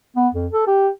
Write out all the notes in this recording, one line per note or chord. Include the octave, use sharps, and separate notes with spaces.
B3
F2
A4
G4